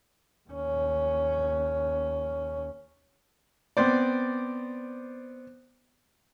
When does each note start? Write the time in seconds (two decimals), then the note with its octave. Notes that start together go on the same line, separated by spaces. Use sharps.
0.49 D#2 C#4
3.77 B3 C4 C5 D5